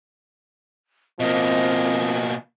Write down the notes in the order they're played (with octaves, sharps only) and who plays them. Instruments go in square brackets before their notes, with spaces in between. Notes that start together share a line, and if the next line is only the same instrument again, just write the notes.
[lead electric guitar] B2 A#3 [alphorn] F3 [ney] C4 [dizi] D#5